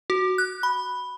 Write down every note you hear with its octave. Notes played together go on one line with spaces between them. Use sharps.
F#4
F#6
B5